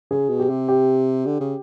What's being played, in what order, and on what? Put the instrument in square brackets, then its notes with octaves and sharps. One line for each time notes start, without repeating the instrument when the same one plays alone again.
[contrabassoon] C#3 [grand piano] G#4
[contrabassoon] B2
[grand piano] G4
[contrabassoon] C3
[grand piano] G4
[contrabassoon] D3
C#3